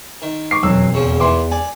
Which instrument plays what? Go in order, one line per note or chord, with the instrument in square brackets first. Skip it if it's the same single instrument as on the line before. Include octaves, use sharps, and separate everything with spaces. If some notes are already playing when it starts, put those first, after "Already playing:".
[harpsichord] D#3
[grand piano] C#6 D6 C7
[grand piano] E1 F2 E6 [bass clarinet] F#3
[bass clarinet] E2 [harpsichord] C#3 F3
[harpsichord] A#2 E3 [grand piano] C6 D6
[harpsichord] D5 [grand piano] G#5